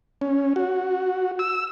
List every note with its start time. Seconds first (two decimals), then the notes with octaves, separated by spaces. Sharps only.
0.21 C#4
0.56 F#4
1.39 E6